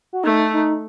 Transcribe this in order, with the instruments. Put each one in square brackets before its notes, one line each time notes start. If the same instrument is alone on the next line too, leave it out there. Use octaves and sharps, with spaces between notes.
[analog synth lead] F#4
[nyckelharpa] A3 [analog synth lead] D#4
[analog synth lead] D#4